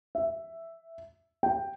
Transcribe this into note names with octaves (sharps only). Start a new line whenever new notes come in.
E5
G5